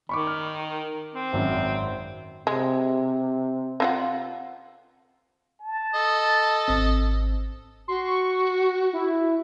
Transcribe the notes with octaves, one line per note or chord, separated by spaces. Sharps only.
D#3 B5 C#6 D6
F6
C4
G#1 F#2
C3 G#3
C4 F4 F#5
A5
A4 D#5
G#1 C4
F#4 C6
C#6
E4